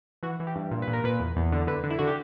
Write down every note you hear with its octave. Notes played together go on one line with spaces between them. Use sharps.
E3 F#4
E3
G4
G2
A#2
B4
A#2
A#4
A#2 B4
E2
E2
D3
D3 B4
D3
E4
D3 F#4
G4